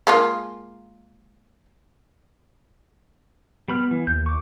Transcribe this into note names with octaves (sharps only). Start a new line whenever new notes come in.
G#3 A#3 F4
G3 B3 B5 F6
E3
D#2 G6
C#6 D6